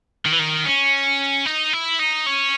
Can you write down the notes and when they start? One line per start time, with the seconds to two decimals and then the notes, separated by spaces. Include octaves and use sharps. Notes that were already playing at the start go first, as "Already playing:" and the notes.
0.25 D#3
0.32 E3
0.39 D#3
0.65 C#4
1.46 D#4
1.73 E4
1.99 D#4
2.26 C#4